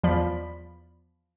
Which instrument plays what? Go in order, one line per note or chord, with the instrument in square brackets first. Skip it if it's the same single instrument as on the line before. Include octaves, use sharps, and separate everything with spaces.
[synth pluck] E2 F3 D5 B5